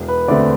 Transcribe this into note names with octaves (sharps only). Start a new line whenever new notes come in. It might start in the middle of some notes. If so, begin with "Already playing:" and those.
Already playing: E1
B4
D2 D3 A3 C4 D5